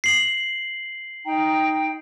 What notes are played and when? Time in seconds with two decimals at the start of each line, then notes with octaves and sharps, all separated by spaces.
0.04 C7 F#7
1.25 D#4 G5 A#5